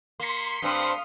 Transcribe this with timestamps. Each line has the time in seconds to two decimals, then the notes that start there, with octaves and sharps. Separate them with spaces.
0.20 A#3 C6 B6 C#7
0.62 G2 C4 F5 D#6